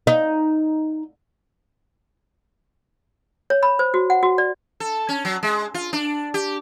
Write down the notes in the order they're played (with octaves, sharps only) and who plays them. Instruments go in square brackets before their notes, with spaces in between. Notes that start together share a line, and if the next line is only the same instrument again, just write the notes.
[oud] D#4
[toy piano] C#5
B5
C5
F#4
F#5
F#4
D5
[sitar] A4
C#4
F#3
G#3
F4
D4
G4